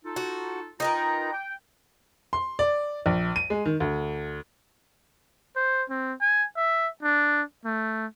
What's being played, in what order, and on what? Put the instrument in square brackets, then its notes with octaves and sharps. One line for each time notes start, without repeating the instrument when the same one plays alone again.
[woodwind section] D#4 F4 A4
[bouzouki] F#4
[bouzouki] D#4 A#4 B4 [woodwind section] F4 G5 A#5
[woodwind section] G5
[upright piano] C6
D5
A#1
D#7
G#3
D#3
D2
[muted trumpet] C5
C4
G#5
E5
D4
A3